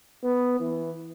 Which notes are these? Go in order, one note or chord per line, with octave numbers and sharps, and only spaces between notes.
B3
E3